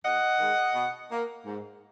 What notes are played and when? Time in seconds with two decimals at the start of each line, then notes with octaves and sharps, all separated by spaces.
0.04 F2 D#5 F#5
0.39 D#3 G#3
0.75 B2
1.10 A#3
1.46 G#2